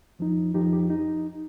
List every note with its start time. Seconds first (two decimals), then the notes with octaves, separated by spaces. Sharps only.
0.19 F2 F3 D#4
0.54 F2 F3 D#4 G4
0.73 G4
0.90 D#4